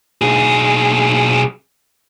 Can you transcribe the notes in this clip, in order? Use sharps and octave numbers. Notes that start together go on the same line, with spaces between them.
B1 G#4